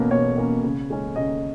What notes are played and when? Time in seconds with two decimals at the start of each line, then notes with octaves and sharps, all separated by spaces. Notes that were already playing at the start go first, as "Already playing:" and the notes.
Already playing: B2 A#3 C#4
0.11 B2 C#5
0.38 A#3 C#4
0.64 C#3
0.90 G#3 C#4
1.16 C#3 D#5